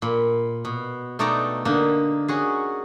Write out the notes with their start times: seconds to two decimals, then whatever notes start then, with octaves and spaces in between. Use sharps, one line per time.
0.02 A#2 B5
0.65 B2
1.19 B2 A3 D#4 D5 G5 A#5
1.65 D3 A#3 D#4
2.28 C#4 F#4 G#4